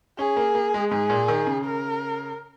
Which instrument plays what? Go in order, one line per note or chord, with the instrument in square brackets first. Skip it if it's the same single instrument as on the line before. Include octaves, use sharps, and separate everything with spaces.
[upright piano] C#4 [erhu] G#4
[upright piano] A#3
A#3
G#3
[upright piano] G#2 [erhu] G#4
[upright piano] A#2
D#3
C#3
[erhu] A#4